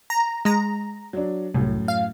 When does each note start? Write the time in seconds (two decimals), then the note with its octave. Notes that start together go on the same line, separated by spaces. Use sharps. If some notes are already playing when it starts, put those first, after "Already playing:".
0.10 A#5
0.45 G#3 A#5
1.13 F#3 D4
1.54 C2 F#2 A2
1.88 F5